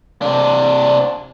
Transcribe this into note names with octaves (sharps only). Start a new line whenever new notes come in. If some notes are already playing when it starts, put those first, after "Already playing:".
C3 D4